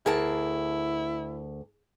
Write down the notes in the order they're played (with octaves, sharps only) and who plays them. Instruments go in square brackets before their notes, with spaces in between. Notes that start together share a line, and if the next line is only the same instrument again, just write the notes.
[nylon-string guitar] D2 A#4 A5 [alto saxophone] E4 [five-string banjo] G#4